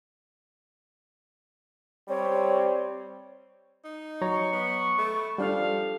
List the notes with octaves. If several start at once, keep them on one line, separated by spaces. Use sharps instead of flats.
G3 C4 C#5
D#4
F#3 C#5 A#5 C#6
B3
A3 B5
F3 G3 D4 A4 F5